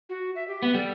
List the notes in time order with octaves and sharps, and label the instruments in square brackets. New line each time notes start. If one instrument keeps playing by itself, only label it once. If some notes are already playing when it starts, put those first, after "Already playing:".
[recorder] F#4
E5
G4
[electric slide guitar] B3
[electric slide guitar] G3 [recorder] A4